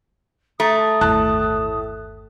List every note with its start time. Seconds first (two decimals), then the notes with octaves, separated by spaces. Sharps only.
0.60 A3 A#5 D#6
1.01 G1 D#2 A2 A5 F#6